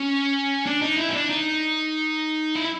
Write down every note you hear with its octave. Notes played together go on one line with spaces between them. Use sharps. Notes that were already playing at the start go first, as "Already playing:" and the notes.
Already playing: C#4
D4
D#4
E4
C#4
D4
D#4
E4